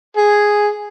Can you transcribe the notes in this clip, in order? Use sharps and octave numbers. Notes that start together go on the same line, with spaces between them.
G#4